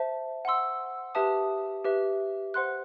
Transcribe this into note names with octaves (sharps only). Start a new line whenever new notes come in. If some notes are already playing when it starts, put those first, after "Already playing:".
Already playing: C5 E5 A5
F#5 C6 E6
G4 B4 E5 A5 D#6
G4 B4 E5
C5 F#5 C6 F#6